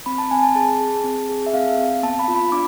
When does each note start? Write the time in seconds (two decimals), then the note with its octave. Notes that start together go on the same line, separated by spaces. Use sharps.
0.06 C4 B5
0.18 A5
0.31 C4 G#5
0.43 A5
0.55 G#4 A5
0.81 G#4
1.04 C4
1.29 G#4
1.46 E5
1.54 C4 F5
1.78 C4
2.03 B3 A5
2.19 B5
2.28 F4
2.36 B5
2.52 D4 D6